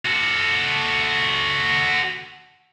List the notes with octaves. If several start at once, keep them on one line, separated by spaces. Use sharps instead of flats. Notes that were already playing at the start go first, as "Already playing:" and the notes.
F#4 A4